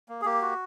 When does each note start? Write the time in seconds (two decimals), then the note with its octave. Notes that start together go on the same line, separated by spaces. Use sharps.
0.09 A#3
0.21 G#4
0.25 A#3 G4
0.42 F#4